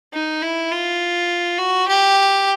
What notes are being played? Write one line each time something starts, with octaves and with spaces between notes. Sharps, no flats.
D#4
E4
F4
F#4
G4